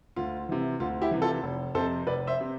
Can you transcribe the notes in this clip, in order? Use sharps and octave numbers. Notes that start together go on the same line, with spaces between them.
D2 F4
C3 E3
D2 F4
E4 G4
C3 E3
F4 A4
F1
F2 C3 A4 C5
F1 B4 D5
C5 E5
C3